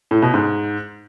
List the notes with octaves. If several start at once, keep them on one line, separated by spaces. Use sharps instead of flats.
A2
B2
G#2